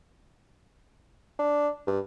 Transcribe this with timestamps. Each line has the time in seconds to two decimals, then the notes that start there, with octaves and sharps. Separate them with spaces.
1.39 D4
1.87 G2